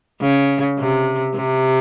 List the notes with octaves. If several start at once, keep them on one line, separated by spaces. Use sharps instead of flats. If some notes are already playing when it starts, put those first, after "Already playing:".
C#3
C3
C3